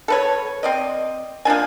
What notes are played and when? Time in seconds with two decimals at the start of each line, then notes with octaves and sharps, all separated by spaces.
0.08 A4 B4 C#5
0.63 C4 D5 D#5
1.45 F3 A#3 D4 G#5